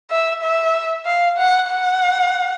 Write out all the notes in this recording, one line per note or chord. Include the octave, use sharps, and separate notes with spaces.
E5
E5
F5
F#5
F#5